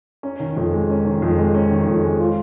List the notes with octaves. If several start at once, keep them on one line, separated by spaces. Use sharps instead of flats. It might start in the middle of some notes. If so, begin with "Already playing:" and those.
C#4
D#3
F2
G#3
C#4
D#3
F2
G#3
C#4
D#3
F2
G#3
F4